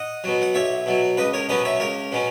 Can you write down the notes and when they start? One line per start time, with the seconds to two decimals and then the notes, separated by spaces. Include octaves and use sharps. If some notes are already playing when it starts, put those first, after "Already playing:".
Already playing: D#5 F#5
0.24 B2 F#3
0.42 F#5
0.54 B1 C#5 E5
0.86 B2 F#3
1.17 C#2 B4 D#5
1.34 A#4 C#5
1.49 B2 F#3 C#4 B4 D#5
1.65 C#5 E5
1.80 C#2 A#4 C#5
2.12 B2 F#3 C#4